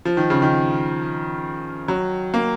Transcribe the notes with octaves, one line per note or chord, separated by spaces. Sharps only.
F3
D#3
C#3
D#3
F#3
A#3